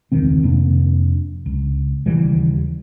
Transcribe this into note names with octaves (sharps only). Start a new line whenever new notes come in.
E1 C#2 D#3 C4
F2 C3 A#3 D4
C#2
D#2 C#3 E3 G3